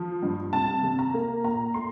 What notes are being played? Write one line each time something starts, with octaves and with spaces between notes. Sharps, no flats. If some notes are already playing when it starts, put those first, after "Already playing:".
Already playing: F3
G2
C2 A5
C3
A#5
A#3
A#2 A#5
A3 C6